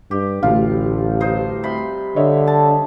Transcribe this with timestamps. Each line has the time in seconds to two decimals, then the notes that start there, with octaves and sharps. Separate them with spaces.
0.11 G2 G4
0.43 A1 D2 A2 F4 F5
1.20 G2 D#4 C5
1.63 C3 B5 C6
2.16 D3 C#5 D#5 E5
2.47 A5